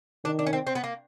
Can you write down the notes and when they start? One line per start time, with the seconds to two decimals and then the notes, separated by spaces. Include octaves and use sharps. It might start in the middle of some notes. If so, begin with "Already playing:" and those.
0.24 D#3 D4
0.39 D4
0.46 C#4
0.53 C4
0.67 C4
0.75 B3
0.84 A#3